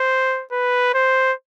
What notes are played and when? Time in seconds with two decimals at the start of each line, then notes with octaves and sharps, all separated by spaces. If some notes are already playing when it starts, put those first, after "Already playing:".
Already playing: C5
0.52 B4
0.94 C5